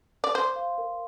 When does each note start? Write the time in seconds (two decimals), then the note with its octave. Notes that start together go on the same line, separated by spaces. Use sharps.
0.24 D5
0.34 C5 C6
0.56 F5
0.78 A#4